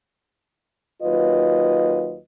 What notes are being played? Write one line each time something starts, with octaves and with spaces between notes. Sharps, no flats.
D#2 F#3 F4 B4 D#5